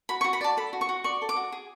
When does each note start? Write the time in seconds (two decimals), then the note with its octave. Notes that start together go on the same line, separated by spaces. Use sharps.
0.09 F#4 B5
0.21 C#6
0.24 F#4
0.33 B5
0.41 D5 A5
0.57 A4 B5
0.73 F#4
0.81 C#6
0.89 F#4
1.04 D5 C#6
1.22 A4
1.29 D6
1.36 F#4
1.52 G#4